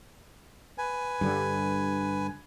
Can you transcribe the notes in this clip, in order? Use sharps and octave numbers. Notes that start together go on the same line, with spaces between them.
B4 G#5
G2 D3 G3